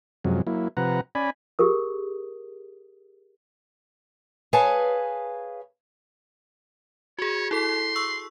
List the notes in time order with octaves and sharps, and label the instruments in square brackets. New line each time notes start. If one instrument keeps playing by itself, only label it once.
[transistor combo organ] F#2 C3 F3 F#3 G#3
F#3 A#3 E4
C3 F3 B4 F#5 A#5
C#4 D5 G#5 B5
[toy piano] G4 G#4 A#4 D#6
[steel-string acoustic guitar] G#4 B4 C#5 F5 G#5 A5
[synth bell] F#4 G#4 [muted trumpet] C#5
[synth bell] E4 A4 B6 [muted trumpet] C6
[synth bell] C#6 E6